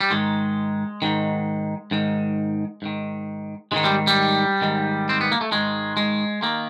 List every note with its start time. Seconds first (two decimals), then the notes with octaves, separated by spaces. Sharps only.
0.01 G3
0.11 G#2 D#3 G#3
1.02 G#2 D#3
1.91 G#2 D#3
2.82 G#2 D#3
3.72 G#2 D#3 G#3
3.84 G3
4.07 G3
4.62 G#2 D#3
5.09 C4
5.21 B3
5.32 A#3
5.41 A3
5.52 G#2 D#3 G#3
5.97 G#3
6.42 D#3 A#3